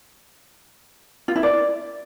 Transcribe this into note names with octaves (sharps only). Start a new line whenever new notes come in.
F4
E4
D5